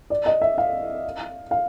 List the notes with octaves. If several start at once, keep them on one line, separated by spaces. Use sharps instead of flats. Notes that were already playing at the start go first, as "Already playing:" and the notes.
D5
D#5
E5
F5
F5